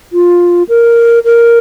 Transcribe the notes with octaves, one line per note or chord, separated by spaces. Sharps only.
F4
A#4
A#4